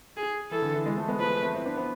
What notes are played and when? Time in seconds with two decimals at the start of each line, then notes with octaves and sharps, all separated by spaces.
0.17 G#4
0.51 E3 A4
0.62 D3
0.74 E3
0.85 E3 G#3
0.97 F3 A3
1.08 G#3 B3
1.19 F3 A3 B4
1.42 A3 C4
1.54 C4 E4
1.65 B3 D4
1.77 B3 D4